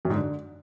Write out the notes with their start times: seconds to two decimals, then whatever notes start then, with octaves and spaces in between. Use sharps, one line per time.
0.05 F#2
0.10 G#2
0.15 D3